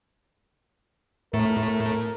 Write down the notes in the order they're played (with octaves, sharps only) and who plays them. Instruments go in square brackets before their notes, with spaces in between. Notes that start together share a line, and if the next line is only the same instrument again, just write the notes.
[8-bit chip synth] A2 A3 [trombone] A#4